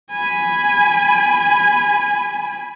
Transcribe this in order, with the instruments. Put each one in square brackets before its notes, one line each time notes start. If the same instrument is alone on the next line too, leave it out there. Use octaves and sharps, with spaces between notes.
[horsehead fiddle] G#5 B5